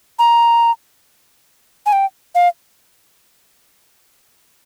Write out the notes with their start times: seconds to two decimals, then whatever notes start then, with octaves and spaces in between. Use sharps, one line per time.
0.19 A#5
1.86 G#5
1.93 G5
2.35 F5